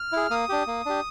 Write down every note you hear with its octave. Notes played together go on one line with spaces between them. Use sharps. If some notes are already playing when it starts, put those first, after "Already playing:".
Already playing: F6
E4 G#4
A#3 D#6
D4 G4
A#3
D4 G4